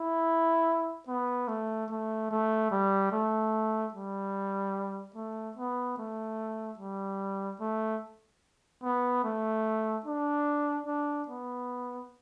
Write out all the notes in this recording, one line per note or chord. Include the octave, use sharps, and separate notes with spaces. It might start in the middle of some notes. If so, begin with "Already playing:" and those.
Already playing: E4
B3
A3
A3
A3
G3
A3
G3
A3
B3
A3
G3
A3
B3
A3
D4
D4
B3